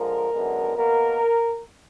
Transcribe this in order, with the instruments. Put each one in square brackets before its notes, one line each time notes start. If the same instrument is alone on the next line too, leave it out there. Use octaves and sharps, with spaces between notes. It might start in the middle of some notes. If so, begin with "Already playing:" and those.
Already playing: [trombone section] D3 F3 G#3 A#4
F#2 D3 G#3 B3
B2 A#3 A#4